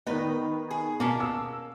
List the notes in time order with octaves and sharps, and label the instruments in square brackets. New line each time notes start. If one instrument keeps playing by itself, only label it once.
[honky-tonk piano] D#3 B3 [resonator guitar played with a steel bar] D#4 B4
[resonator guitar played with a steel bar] G#4
[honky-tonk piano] B2 [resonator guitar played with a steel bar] A#3 C#4 A5
[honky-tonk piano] E6